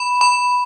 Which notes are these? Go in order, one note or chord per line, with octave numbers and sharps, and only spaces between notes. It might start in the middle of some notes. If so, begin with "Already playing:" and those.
Already playing: B5
B5